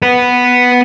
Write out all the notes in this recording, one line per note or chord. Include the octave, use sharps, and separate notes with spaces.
B3 B4